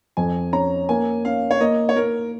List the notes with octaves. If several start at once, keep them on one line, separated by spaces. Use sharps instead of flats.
F2 G#5
C#4 A#5
A#3 G#5
C#4 F5
C#5
A#3 D#5
C#5
A#3 A#4